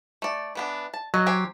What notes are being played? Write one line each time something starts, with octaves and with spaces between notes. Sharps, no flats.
A3 D5
E3 B3 D4
A5
F#3 D#5
C4 G4 G#5